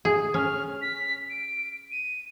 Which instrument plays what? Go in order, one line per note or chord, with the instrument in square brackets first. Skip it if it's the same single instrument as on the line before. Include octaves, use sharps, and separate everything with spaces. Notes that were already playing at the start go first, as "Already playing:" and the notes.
[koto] G#4
[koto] C#4 [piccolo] F6
[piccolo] B6
D7
D#7